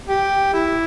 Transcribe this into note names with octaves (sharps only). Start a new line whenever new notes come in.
G4
E4